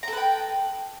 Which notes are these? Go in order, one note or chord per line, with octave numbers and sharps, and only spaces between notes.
A4 B4 G5 A#5